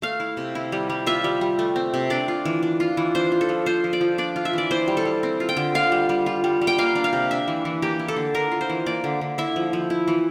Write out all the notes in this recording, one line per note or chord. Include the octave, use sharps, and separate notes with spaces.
A3 F5
E4
C3
E4
G3
G3
F4 E5
G3
G3
A3
C4
C3
D4 D5
F4
E3
D4
F4
E3
D4 C5
F4
A4
F3
F4 C5
F3
D5
F3
D4 D5
F4
E5
E3 D5
E4 C5
G3
A4
G3
C4
F4
G5
D3
F4 F5
G3
G3
F4
G3
G3
G5
A#3 F5
D4
F5
C3
D4 E5
E3
E3
A#3 G4
E4
A4
D3
D4 A#4
F4
C5
E3
A#3 D5
D3
D3
E4 E5
F3
F3
E4
E3